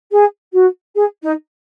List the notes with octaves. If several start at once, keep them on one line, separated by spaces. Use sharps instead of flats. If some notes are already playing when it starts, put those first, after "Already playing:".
G#4
F#4
G#4
D#4